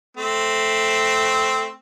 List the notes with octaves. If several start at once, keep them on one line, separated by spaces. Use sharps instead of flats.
A3 C4